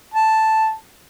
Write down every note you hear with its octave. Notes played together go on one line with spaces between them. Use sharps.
A5